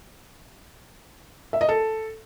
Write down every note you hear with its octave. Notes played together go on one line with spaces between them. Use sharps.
E5
D#5
A4